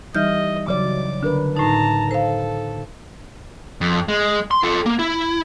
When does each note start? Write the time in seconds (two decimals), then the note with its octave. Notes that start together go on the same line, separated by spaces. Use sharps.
0.15 E3 G3 D#4 D#5 E5 F6 G6
0.68 C#3 F#3 D5 D6
1.23 D3 D4 A#4 B4
1.57 A2 D#4 A5 A#5
2.11 A4 C5 F5
3.81 F2
4.08 G#3
4.51 C6
4.63 F4 A4
4.86 A#3
4.99 E4